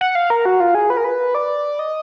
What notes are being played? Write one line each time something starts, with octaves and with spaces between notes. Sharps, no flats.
F#5
F5
A#4
F#4
F4
G#4
B4
A#4
B4
D5
D#5